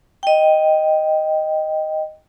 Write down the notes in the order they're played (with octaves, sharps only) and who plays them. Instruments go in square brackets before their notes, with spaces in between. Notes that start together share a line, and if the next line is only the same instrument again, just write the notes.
[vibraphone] D#5 G5